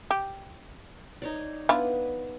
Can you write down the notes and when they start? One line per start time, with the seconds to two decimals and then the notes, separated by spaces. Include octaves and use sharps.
0.11 G4
1.22 D#4 C#5 D5
1.69 B3 D4 E4 F4